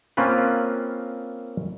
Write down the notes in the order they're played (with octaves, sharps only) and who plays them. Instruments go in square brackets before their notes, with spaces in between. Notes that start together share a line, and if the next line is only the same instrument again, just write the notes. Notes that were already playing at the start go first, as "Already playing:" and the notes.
[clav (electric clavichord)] A#3 C4 C#4 F4 B4